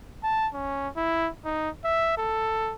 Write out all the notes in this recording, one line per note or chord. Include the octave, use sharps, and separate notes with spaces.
A5
C#4
E4
D#4
E5
A4